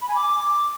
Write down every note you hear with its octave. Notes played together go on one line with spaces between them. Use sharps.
B5
G#5
D6